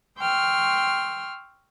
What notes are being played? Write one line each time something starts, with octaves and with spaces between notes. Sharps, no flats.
G5 C6 C#6 E6 F6